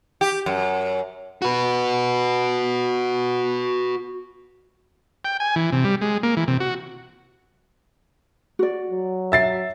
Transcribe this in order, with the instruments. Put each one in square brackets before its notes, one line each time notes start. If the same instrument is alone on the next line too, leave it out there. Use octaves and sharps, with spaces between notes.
[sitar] G4
F#2
[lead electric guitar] F#4 B4
[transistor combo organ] G5
G#5
E3
C3
G3
G#3
A#3
E3
C3
F#4
[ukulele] F#4 D5
[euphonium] F#3
[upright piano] E5 A6 C7